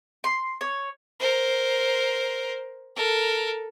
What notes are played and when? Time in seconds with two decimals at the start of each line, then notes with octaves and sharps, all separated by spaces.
0.24 C6
0.61 C#5
1.19 A#4 C5
2.96 A4 A#4